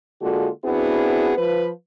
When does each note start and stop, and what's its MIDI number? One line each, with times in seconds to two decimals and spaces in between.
0.22 0.49 50
0.22 0.49 56
0.22 0.49 58
0.22 0.49 65
0.22 0.49 66
0.22 0.49 69
0.64 1.33 59
0.64 1.33 60
0.64 1.33 62
0.64 1.33 64
0.64 1.33 66
0.64 1.33 68
1.37 1.70 53
1.37 1.70 71